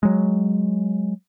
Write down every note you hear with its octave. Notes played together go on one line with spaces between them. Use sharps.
F#3 G#3